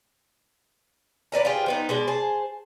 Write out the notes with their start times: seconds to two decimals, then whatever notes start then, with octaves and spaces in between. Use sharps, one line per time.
1.32 B4 D5 D#5 A#5
1.45 F4 G4 G#4 C5
1.66 F3 B3 D#4
1.89 B2 G#3 D5
2.07 G#4 C5 A5